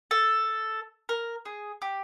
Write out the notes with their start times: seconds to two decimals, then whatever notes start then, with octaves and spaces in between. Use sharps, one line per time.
0.11 A4
1.09 A#4
1.45 G#4
1.82 G4